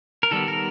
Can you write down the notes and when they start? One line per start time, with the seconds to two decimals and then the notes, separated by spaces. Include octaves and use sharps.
0.23 A#4
0.31 D#3 G3 B3 A4
0.48 A#4